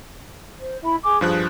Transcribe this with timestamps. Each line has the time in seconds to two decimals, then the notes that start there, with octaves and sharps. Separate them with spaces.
0.59 C5
0.82 E4 E5 B5
1.02 G#4 G#5 D6
1.21 G2 F3 G#4 F#6